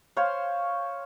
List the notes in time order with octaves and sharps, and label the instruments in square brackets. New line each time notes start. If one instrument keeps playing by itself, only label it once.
[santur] C5 C#5 F5 C6